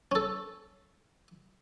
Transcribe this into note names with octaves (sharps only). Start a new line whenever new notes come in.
C#4 A4